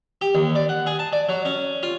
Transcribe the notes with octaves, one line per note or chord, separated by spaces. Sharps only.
G4
D#2
D5
F#5
G#4
A5
D5
F#3
C#4
F4